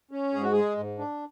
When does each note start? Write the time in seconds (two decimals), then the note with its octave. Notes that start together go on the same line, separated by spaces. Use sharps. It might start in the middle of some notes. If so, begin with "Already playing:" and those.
0.11 C#4
0.33 G#2 G#4
0.43 F#4
0.53 G#3 G#4
0.77 G#2
0.99 D4